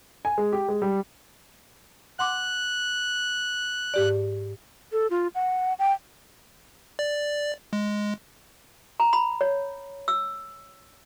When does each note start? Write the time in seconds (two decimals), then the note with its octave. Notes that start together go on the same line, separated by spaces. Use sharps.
0.25 G#5
0.38 G#3
0.53 G4
0.68 G#3
0.82 G3
2.19 F#5 C6 D6 F#6
3.94 G#2 G4 D5
4.92 A4
5.10 F4
5.35 F#5
5.79 G5
6.99 D5
7.73 G#3
9.00 A#5
9.13 B5
9.41 C#5
10.08 E6